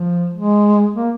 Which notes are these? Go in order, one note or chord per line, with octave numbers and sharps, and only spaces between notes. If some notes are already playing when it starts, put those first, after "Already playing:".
Already playing: F3
G#3
A#3